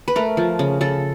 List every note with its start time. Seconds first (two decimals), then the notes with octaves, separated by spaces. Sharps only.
0.08 B4
0.16 A3 A#4
0.37 F3
0.59 C#3
0.81 C#3 A4